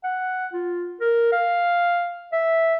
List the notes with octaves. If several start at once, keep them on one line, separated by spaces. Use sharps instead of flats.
F#5
F4
A#4
F5
E5